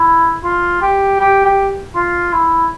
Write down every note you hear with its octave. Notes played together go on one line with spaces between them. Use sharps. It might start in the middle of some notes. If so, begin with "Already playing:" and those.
Already playing: E4
F4
G4
G4
G4
F4
E4